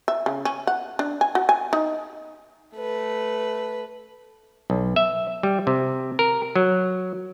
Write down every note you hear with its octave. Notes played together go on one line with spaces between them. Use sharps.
E5
C#3
C#4
F#5
D4
G#5
F#4
G#5
D#4
A3 B4
B1
E5
G3
C3
A#4
F#3